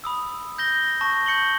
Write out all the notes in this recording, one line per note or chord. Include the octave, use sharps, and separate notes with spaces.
B5 D#6 E6
G6 A#6 G7
A5 C#6 A#6
G6 C#7 F#7 G7